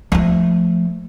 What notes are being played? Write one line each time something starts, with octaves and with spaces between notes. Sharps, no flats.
F3 A3